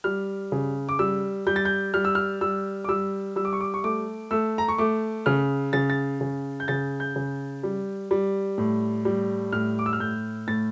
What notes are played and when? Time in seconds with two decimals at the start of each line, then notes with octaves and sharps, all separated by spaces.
0.04 G3 F6
0.52 C#3
0.89 D6
0.99 G3 E6
1.47 G3 G6
1.56 A6
1.65 G6
1.94 G3 F6
2.05 E6
2.15 F6
2.41 G3 E6
2.84 D6
2.89 G3 E6
3.36 G3 E6
3.45 D6
3.53 C#6
3.60 D6
3.74 C#6
3.84 A3 D6
4.31 A3 E6
4.58 A#5
4.68 C#6
4.78 A3 D6
5.26 C#3 F6
5.73 C#3 A6
5.90 A6
6.21 C#3
6.60 G6
6.68 C#3 A6
7.00 G6
7.16 C#3
7.63 G3
8.11 G3
8.58 A2
9.05 G3
9.52 A2 F6
9.79 D6
9.86 E6
9.93 F6
10.00 A2 G6
10.48 A2 A6